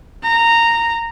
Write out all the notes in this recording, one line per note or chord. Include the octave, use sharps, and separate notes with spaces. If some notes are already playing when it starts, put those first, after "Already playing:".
A#5